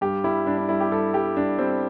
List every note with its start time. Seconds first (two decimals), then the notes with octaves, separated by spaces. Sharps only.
0.01 G2 G4
0.24 G3 E4
0.46 G2 D4
0.58 D4
0.69 G3 E4
0.80 G4
0.91 G2 A4
1.14 G3 G4
1.36 G2 D4
1.58 G3 C4